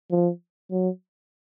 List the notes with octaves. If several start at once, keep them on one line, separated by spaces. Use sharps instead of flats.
F3
F#3